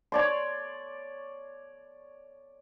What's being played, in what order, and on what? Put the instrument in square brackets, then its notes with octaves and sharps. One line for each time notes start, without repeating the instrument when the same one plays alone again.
[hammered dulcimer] C#5 D5 C6